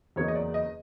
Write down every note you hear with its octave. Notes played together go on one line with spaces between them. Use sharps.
E2 C#3 F#3 A#3 D#4 C#5
D#5
D5
D#5